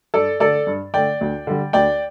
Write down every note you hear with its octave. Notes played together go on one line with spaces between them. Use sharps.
G2 A4 D5
D3 A3 A4 D5
G2
D3 A3 D5 G5
D2
D3 G3
D2 D5 G5